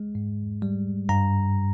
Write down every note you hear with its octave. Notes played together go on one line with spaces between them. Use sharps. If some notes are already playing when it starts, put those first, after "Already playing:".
Already playing: G#3
G#2
G3
G2 A#5